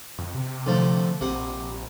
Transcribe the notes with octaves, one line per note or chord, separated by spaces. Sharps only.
F2
C3
D3 F3 A3
A#1 C3 F#5